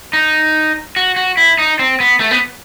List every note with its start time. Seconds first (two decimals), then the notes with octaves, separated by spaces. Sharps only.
0.13 D#4
0.96 F#4
1.16 F#4
1.37 E4
1.58 D#4
1.79 C4
2.00 B3
2.20 A3
2.31 B3